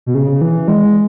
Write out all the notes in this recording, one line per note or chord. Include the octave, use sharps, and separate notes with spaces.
B2
C#3
E3
G#3